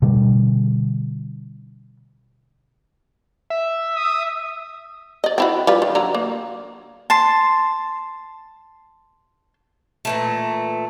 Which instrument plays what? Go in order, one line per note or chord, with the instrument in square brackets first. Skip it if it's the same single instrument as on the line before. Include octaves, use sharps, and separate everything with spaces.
[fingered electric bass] B2 D3 G3
[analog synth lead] E5
[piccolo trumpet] D#6
[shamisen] D5 D#5
C4 E4 F#4
G3 F4 B4
D#3
D3 F#3 A#5
A#3
[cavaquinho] A5 C6
[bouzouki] A#2 E3 A3